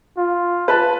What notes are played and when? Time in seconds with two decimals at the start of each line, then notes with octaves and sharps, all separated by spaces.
0.18 F4
0.68 B4 A5